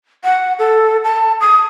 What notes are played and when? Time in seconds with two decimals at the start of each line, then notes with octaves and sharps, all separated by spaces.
0.24 F#5
0.59 A4
1.04 A5
1.41 D#6